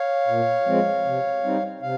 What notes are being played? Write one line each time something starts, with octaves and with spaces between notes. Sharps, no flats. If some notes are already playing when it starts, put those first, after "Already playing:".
Already playing: C#5 F5
A#2
F3 G#3 C4
C3
G3 C4 D#4
C3 F5